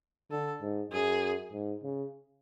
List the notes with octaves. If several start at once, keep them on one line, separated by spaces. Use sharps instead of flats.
D3 A4
G#2
F#2 G#4
G#2
C#3